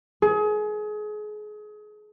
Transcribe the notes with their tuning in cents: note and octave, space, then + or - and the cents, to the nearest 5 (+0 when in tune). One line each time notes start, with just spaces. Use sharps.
G#4 +30